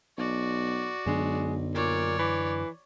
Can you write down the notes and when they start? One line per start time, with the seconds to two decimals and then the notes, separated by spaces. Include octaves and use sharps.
0.18 B1 F#4 D5
1.06 B1 F#2 D3 G#3 D4
1.75 A#2 C#5 D5
2.18 E3